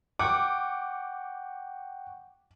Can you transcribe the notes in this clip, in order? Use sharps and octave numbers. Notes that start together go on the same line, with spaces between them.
F#5 G5 C#6 D6